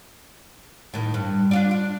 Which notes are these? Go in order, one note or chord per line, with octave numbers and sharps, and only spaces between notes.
A2 D#3
G2
D4 F4 D5
D4